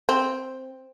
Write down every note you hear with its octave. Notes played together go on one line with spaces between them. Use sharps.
C4